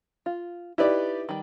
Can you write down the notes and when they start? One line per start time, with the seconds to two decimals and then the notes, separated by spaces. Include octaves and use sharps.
0.26 F4
0.78 D#4 E4 G4 B4 D5
1.29 D#3 G3